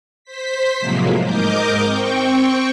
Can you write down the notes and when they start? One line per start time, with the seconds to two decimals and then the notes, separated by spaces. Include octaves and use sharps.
0.24 C5 B6
0.80 A2 C3 F3 F#3 G#3 A#3
1.22 G#2 A#4 D#5 D6 G6
1.83 C4 G5 C#6